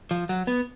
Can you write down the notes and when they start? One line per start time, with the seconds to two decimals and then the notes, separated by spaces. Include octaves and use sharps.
0.11 F3
0.29 F#3
0.47 B3